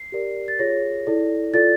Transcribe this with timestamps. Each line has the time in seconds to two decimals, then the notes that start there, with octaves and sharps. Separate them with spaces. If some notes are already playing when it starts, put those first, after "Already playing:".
Already playing: C7
0.12 G4 A#4 D5
0.48 A6
0.59 F4 G#4 C#5 A#6
1.07 E4 A4 D5
1.54 F4 A4 D5 A6